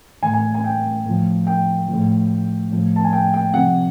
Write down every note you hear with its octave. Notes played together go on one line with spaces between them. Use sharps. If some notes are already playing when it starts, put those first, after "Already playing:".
A2 E3 G#5
G#5
G#5
G5
A2 F3
G5
F3
A2
A2 F3
A5
G#5
G5
G5
C3 F3 F#5